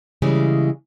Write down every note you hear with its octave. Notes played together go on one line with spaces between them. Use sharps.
C#3 E3 G3 G#3